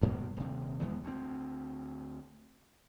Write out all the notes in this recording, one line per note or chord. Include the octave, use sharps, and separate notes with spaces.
D2 G2 B2 A#3
D#1 C3
E2 E3 G#3 B3
D2 C4